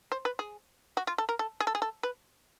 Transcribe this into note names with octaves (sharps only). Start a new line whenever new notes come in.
C5
B4
G#4
F#4
F4
A4
A#4
A4
G#4
A4
G#4
A4
B4